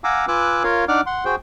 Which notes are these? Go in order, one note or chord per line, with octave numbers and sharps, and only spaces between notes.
F5 F#5 G#5 A#5 D6 E6
F4 B4 G#5 D6 E6 F#6
F4 A#4 C#5 F5
D4 D#4 D5 F#5 D6 F6
F#5 C6
F#4 G#4 C5 G5